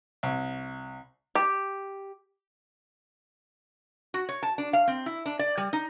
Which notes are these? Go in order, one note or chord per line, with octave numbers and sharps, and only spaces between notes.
C2
G4
F#4
C#5
A5
D4
F5
C4
E4
D4
D5
G3
D#4